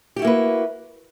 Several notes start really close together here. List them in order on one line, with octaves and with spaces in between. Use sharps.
G4 F#4 E4 A#3 B4